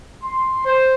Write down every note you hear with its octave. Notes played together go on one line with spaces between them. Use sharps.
C6
C5